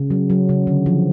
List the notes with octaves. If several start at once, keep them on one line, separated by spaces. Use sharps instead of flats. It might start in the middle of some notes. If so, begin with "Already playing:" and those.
Already playing: C#3
F#3
F#3
C#3
D3
F3